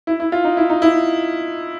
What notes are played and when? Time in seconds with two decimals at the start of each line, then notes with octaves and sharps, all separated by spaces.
0.07 E4
0.20 E4
0.32 F4
0.44 D#4
0.57 E4
0.70 D#4
0.82 E4